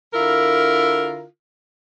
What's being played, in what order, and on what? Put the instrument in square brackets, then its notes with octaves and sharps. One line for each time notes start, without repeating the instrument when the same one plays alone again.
[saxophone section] D3 E4 F4 A#4